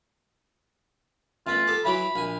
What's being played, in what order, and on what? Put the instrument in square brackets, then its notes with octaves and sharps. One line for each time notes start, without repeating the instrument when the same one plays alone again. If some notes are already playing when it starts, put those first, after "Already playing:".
[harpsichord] A1 B3 B5 [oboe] F4
[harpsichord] G4 A4
[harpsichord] E3 F#3 D6 [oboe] B5
[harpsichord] A#1 G#5